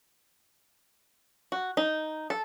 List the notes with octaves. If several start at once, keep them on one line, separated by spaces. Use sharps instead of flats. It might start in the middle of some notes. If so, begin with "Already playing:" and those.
F#4
D#4
A4